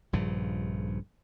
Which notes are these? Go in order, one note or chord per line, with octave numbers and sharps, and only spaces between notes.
A#1 G2 C#3 F3